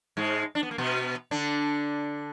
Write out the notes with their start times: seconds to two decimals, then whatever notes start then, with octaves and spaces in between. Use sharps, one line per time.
0.17 G#2 G#3
0.55 D4
0.63 B3
0.71 A#3
0.78 B2 B3
1.31 D3 D4